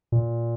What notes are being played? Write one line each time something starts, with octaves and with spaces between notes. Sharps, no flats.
A#2